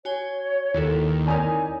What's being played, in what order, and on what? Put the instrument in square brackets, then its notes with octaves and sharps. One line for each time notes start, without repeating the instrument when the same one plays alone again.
[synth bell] F#4 G#5 G7 [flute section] C#5
[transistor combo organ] D#2 [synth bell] E4 F#4 A4
[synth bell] C4 E4 A#4 [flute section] D#4 C#5 [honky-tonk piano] D5 G#5 D#6